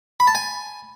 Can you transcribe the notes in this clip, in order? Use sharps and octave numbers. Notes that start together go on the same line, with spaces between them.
B5
A5
G#5